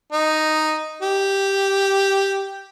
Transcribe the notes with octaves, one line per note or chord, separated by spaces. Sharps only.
D#4
G4